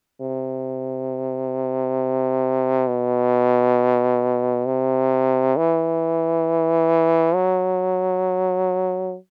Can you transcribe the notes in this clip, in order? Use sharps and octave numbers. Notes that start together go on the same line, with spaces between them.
C3
B2
C3
E3
F#3